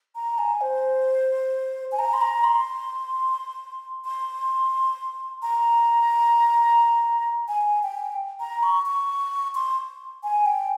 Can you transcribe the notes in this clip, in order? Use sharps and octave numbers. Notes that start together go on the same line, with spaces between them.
A#5
G#5
C5
G#5
A#5
C6
A#5
C6
C6
A#5
G#5
G5
A#5
C#6
C#6
C6
G#5
G5